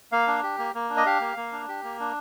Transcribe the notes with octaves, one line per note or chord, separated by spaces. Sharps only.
A#3 F5
D4
G4
A#3
A#3
D4
D#5
G4 F5
A#3
A#3
D4
G4
A#3
D4